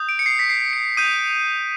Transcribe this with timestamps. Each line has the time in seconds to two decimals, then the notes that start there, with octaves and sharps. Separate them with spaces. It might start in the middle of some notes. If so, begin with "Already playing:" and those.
Already playing: D#6 G6
0.09 D7
0.19 C#7
0.26 C7
0.39 B6
0.50 C7
0.73 C#7
0.97 D#6 G6 D#7